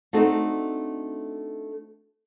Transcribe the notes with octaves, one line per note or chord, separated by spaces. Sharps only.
A3 C4 D4 D#4 F#4 A4